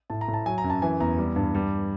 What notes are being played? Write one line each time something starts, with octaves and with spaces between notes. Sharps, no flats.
A2 A5
A#5
A2
A5
F#3 G#5
A#5
F#2
A5
E3 G#5
E2 A#5
G3
G2
G3